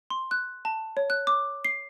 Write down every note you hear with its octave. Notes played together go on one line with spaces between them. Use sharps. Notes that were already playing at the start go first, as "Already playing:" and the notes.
C6
F#6
A5
C#5
F#6
D6
C7